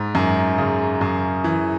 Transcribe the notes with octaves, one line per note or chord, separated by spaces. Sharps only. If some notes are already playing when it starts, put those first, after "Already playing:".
Already playing: G#2
F#2
C#3
F#2
E3